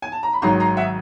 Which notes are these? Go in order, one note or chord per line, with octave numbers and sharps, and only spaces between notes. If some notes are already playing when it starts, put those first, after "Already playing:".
G#5
A5
A#5
B5
G#1 G#2 D#3 F#3 A#5 C6
A#5 C6
E5 F#5